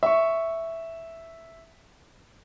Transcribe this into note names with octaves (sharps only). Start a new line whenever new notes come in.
E5 C#6